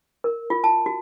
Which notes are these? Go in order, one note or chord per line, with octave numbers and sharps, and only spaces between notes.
A#4
F4
A5
F#4